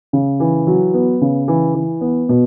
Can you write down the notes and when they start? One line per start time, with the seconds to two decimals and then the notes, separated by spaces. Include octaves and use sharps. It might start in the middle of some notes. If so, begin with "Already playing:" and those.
0.13 C#3
0.40 E3
0.67 F#3
0.94 B3
1.21 C#3
1.48 E3
1.74 E3
2.01 B3
2.29 B2